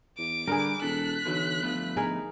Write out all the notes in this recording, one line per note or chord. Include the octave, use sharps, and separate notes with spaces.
E2 D6
D3 G3 D4 G#4 A#4
E1 A4 F#6 B6
B1 D3 E3 F#3
G1 F3 A3 B3
D#4 G#4 A#4